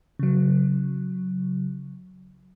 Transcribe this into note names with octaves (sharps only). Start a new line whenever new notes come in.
C#3 F#3